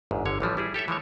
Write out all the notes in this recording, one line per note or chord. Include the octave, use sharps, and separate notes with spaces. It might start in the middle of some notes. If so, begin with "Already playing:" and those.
G1 E2 G#2
G1 D3 C#5
A1 E3 F3 G3
G3 E4 G#4
G4 A4 C#5 E5
E3 F3 G#3 C#5